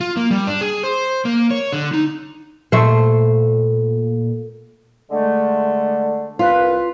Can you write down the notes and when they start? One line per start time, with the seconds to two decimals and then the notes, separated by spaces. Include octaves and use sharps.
0.01 F4
0.17 A#3
0.31 G3
0.47 D4
0.61 G#4
0.83 C5
1.25 A#3
1.51 C#5
1.73 D3
1.94 D#4
2.72 A#2 A3 C5
5.11 D3 G#3 A3
6.39 C2 F4 B4